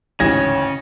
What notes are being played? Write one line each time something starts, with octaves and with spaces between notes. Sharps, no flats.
A1 D2 G#2 C#3 C#4 G#6 A#6